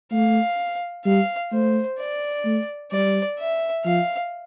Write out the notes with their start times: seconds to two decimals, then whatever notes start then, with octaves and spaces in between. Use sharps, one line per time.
0.12 A3 F5
1.05 G3 F5
1.52 A3 C5
1.99 D5
2.45 A3
2.91 G3 D5
3.39 E5
3.85 F3 F5